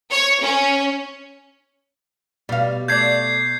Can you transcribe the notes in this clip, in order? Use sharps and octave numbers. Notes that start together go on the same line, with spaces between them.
C#5
C#4
B2 G3 F5
A3 D5 G6 G#6 C7